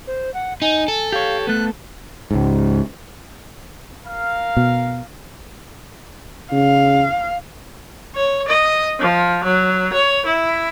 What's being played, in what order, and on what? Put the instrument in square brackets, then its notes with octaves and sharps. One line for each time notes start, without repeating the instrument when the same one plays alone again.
[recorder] C5
F#5
[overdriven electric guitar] D#4 [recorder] G#5
[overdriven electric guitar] A4
[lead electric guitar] G4 C#5 [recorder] F5
[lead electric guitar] A3 B3 [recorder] F#6
[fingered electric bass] C#2 G#2
[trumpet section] A#4 F5
[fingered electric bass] B2
[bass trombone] C#3 [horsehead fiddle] F5
[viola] C#5
D#5
F3
F#3
C#5
E4